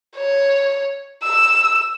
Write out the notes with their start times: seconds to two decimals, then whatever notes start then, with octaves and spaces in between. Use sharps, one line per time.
0.16 C#5
1.23 E6